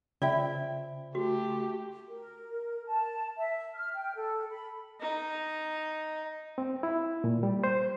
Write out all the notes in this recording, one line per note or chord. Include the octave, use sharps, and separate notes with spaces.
C#3 F4 C5 D5 E5 G5
A3 F#4 G4
A#4
A5
E5
F6
G5
A4
B5
D#4
C4
E4
A#2
G3
C5